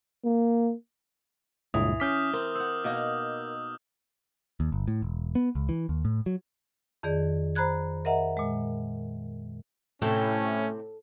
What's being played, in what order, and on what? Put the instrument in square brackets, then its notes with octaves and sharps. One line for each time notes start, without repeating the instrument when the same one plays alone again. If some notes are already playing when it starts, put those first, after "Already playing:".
[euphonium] A#3
[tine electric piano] C#2 G2 A#2 [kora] E3 [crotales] D#6
[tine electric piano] C#4 B6 [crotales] D6 F6 G6
[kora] C4 [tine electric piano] A#4
[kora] C5 F#5 [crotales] E6
[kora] B2 A#3 D#4
[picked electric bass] D#2
G1
A2
E1
B3
C#2
E3
D#2
A2
F#3
[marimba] F2 D#3 G#4 D5
C5 A#5 B5 F#6 G#6
A#4 D#5 E5 F#5 A#5
A#2 G#3
[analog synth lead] A2 [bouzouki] C3 E4 G5 [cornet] C#4 [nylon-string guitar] A4